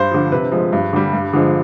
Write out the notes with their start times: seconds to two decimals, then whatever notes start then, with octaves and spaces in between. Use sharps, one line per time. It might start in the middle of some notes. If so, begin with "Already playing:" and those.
Already playing: G2 C5
0.11 D3 F3
0.32 C3 B4
0.52 F3 G#3
0.73 G2
0.93 D3 G3
1.13 G2
1.33 D3 F3 G#3